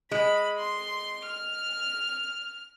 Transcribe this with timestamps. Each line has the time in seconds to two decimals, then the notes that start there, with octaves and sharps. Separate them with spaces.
0.11 G#3 B5
0.58 C6
1.25 F6